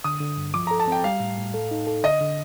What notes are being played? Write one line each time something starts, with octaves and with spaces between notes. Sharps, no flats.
D3 D#6
D3
G2
F3 D6
A4 A#5
A5
C4 G5
G3 F5
A2
A2
A4
D#4
A4
D3 D#5
D3